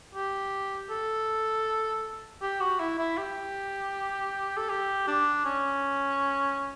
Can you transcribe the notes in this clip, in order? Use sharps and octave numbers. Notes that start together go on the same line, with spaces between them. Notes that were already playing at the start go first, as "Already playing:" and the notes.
G4
A4
G4
F#4
E4
E4
G4
A4
G4
D4
C#4